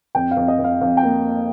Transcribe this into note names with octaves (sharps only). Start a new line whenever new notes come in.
F2 G5
F5
F2
D#5
F2
F5
F2 F5
G5
A#3